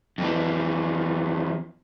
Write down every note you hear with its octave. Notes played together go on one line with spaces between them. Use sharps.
F2 E3